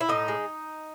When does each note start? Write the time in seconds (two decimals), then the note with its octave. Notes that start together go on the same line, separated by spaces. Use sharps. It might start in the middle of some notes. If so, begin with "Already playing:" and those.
0.01 E4
0.09 A2 D#4
0.28 G#3